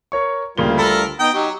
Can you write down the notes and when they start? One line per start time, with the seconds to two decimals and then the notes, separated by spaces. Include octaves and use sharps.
0.12 A#4 C#5 C#6
0.58 D2 C#3 G3 A#3 F4 G7
0.78 A4 A#4 B5
1.20 B3 D#4 G5 A#5 D#6
1.34 F#3 D#4 G4